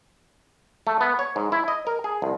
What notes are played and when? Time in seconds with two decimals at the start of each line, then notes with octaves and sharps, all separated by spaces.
0.87 A3
1.01 B3
1.19 C#5
1.36 G#2
1.52 E4
1.68 D#5
1.87 A#4
2.04 G#4
2.22 C2